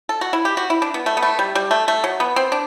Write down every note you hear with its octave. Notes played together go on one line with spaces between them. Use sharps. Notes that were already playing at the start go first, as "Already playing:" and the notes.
A4
F#4
E4
G4
F#4
E4
D4
B3
A3
B3
A3
G3
G3
A3
A3
F#3
B3
C4
D4